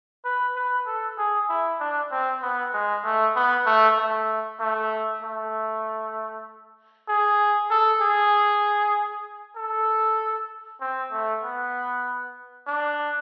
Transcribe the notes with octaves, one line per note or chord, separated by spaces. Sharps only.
B4
B4
A4
G#4
E4
D4
C4
B3
G#3
A3
B3
A3
A3
A3
A3
G#4
A4
G#4
A4
C4
A3
B3
D4